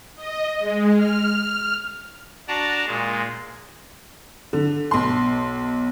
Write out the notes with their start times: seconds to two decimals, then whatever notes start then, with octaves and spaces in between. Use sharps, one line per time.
0.16 D#5
0.59 G#3
0.95 F6
2.48 D4 F#4 D5 A5 A#5
2.87 A#2 G#3
4.53 D3
4.91 B1 C6